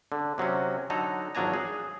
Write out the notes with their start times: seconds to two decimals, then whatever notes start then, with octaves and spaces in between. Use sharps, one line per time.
0.12 D3
0.38 C3 F#3 C4 C#4
0.90 D3 F#3 D#4 A4 A#5
1.35 G#1 F3 F#3 D4 G#5 A#5
1.54 G#4